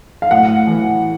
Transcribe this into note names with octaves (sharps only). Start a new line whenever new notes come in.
F5
A2 F#5
E3